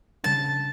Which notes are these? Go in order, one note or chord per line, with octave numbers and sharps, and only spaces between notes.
C#3 G3 D4 A5